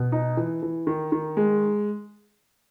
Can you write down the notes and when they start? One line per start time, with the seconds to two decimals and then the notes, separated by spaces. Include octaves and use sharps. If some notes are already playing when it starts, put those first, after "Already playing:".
Already playing: B2
0.12 D#4
0.37 E3
0.62 E3
0.87 D#3
1.12 D#3
1.37 G#3